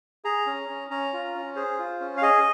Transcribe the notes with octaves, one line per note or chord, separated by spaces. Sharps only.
G#4 A#5
C#4
C#4
C#4 A#5
F4
C#4
G#4 C5
F4
C#4
F5
G#4 D#5